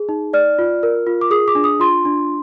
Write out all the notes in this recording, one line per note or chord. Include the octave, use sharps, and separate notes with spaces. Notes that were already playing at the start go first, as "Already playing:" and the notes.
Already playing: G#4
D#4
D5 F6
F4
A#4
F4
D6
G#4 D#6
D6
D4
D#6
F4 C6
D4